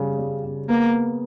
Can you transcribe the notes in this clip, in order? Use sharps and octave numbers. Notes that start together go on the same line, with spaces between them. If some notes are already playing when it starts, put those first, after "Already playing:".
Already playing: C#3 G3
G3
C#3
A#3 B3
B3